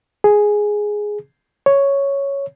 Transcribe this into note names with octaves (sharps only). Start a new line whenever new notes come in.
G#4
C#5